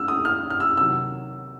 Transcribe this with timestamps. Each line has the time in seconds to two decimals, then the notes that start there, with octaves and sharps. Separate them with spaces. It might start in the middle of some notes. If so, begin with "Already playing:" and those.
Already playing: E6 F6
0.08 D#6
0.25 F6
0.50 F6
0.60 E6
0.77 C3 D#3 F#3 E6